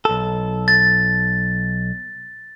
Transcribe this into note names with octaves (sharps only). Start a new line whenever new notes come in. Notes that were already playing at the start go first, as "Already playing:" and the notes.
B1 A4
A6